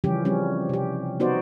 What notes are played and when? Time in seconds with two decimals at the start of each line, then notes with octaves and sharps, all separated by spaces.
0.04 C#3 E3 F3 G3 C#4 G4
0.25 F3 G3 C4 C#4
0.69 C3 G4
1.20 B3 D#4 F#4 C5 D5